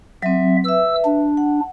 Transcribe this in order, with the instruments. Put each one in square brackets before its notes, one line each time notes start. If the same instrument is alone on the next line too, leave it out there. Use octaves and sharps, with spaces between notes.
[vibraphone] F#3 C4 [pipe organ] E5
[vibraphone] B4 E5 [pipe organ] E6
[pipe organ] D4
[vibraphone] F#5